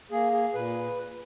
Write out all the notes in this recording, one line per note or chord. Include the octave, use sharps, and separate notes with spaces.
A#3 G#4
G#4
A#2 B4